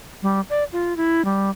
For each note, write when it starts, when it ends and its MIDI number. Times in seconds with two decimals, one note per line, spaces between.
0.23 0.41 55
0.50 0.64 74
0.72 0.96 65
0.97 1.25 64
1.25 1.50 55